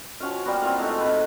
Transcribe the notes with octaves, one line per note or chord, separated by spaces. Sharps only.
F3 C#4 F#4 F5
G3 A#3 B3 F#4
C4 E4 F4 F5
G#3 A3 D#4
C3 B4